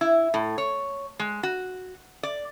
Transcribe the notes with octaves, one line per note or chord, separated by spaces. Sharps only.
E4
A2
C#5
G#3
F#4
D5